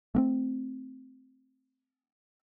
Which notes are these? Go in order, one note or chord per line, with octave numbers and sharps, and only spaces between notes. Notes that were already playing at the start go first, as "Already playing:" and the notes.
A3 A#3 C4